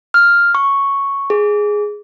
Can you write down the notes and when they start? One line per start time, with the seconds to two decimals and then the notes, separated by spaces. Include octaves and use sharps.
0.14 F6
0.55 C#6
1.30 G#4